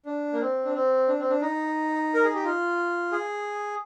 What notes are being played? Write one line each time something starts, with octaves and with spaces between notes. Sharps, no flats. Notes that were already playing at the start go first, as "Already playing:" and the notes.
D4
A#3
C4
D4
C4
D4
C4
D4
D#4
A#4
G#4
G4
F4
G#4